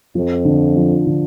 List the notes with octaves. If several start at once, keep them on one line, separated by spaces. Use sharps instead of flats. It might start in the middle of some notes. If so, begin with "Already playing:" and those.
F2 F3
D3
F3
D3